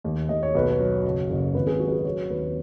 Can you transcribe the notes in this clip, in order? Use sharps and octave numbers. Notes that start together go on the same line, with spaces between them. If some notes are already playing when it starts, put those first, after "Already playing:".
D#2
D#2 D#5
C#5
B1 B4
C#5
F#3
F#1
F#1
G#1 B4
G#4
F#3 F#4
B4
G#4
F#3 C#5
D#2 B4